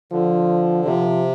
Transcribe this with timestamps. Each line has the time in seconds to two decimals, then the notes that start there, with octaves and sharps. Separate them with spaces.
0.12 D3 F3
0.84 C3 F3